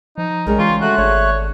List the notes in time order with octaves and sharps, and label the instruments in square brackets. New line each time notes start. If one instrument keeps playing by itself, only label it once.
[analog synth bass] F3 [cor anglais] D#4
[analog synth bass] B1 [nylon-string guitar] C#3 G3 G#3 [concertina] A#4 A#5
[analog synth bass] E3 [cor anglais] F4 [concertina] C6 C#6
[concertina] A3 F#6 [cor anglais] F#4
[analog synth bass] G#1 [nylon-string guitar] D4 [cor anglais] C#5